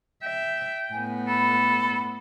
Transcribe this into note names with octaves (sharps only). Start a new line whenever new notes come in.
E5 G5
A2 B3 G#5
A4 B5